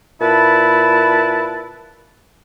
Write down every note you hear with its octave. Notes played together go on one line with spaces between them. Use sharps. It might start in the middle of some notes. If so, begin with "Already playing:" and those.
A#2 E4 B4 A5